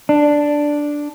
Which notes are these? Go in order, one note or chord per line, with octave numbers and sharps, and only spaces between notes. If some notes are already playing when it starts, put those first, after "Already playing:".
D4